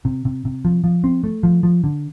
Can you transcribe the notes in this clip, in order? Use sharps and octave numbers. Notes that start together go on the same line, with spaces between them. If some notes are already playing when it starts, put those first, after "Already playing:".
C3
C3
C3
F3
F3
C4
A3
F3
F3
D3